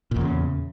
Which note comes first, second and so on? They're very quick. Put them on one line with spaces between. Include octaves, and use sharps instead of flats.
A#2 E2 C#3